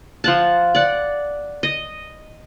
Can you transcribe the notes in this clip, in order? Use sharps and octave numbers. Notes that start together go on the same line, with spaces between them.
F3 F#5 A5
D5 F#5
D#5